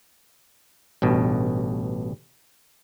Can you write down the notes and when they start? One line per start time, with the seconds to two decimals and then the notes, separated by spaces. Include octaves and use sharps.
1.02 A1 G2 B2